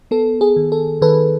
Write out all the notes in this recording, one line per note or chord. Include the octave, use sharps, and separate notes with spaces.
B3 A4
G#4
D#3
A4
D#3 A4 B4